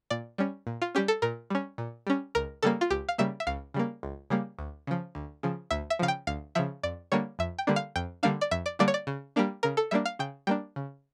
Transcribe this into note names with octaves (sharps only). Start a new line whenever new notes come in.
A#2 D5
G3 C#4
A#2
F4
G3 C#4 G4
A4
A#2 A#4
G3 C#4
A#2
G3 C#4
C#2 A#4
C#3 G3 A#3 A4
F4
C#2 G4
F5
C#3 G3 A#3 E5
E5
C#2 F5
C#3 G3 A#3
C#2
C#3 G3 A#3
D2
C#3 F3
D2
C#3 F3
D2 E5
E5
C#3 F3 F5
G5
D2 F5
C#3 F3 E5
F2 D5
D3 G3 A#3 D4 C#5
F2 E5
G5
D3 G3 A#3 D4
F5
F2 G5
D3 G3 A#3 D4 F5
D5
F2 E5
D5
D3 G3 A#3 D4 D5
C#5
D5
C#3
G3 A#3 D4
C#3 A#4
A4
G3 A#3 D4 E5
F5
C#3 G5
G3 A#3 D4 G5
C#3